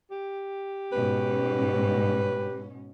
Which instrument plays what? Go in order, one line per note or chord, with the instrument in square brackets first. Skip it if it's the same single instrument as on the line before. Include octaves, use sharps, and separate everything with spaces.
[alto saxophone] G4
[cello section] G#2 B2 C#4 [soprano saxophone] B4